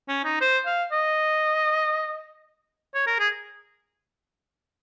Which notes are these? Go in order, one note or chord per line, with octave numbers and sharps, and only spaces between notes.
C#4
D#4
C5
F5
D#5
C#5
A#4
G#4